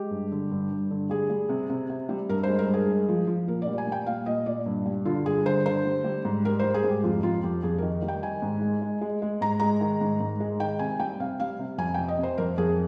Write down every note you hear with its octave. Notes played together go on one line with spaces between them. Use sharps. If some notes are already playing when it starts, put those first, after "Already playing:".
Already playing: G#3 G4
G2
D3
G2
G2
D3
G3 G#4
G3
C3
C3
C3
G3
G2 A#4
C5
G#3
A#4
G2
G#4
G#3
F3
F3
A#2 A#4
D5
G3
G#5
G3 G5
A#2 F5
A#2 D#5
A#2 D5
G2
G3
D3 F4
G2 G#4
D3 C5
D3 C5
G3
G3
G#2
G3 A#4
G3 C5
G#4
G#2
G4
F2 F4
F2 F4
F2 G4
F2 G#4
D#3 A#4
G3
G5
D#3 G#5
G#2
G#3
G#3
G#3
G#3
G#2 A#5
G#3 A#5
D#3
G#2
G#2
G#3
D#3 G5
C3 G#5
G3 G5
C3 F5
G3 F5
C3
F2 G#5
C3 G5
D#5
C3
C5
F2 A#4
F2 G#4